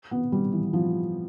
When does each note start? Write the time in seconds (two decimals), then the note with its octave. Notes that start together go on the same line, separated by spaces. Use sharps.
0.11 B3
0.32 G3
0.52 E3
0.73 F3